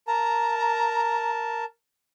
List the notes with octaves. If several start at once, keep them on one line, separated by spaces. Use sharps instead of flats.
A#4 A5 A#5